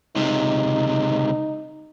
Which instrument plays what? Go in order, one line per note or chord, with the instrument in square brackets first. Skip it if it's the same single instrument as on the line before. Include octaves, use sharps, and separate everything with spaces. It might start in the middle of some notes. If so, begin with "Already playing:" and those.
[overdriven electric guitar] C#2 C3 [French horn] D#4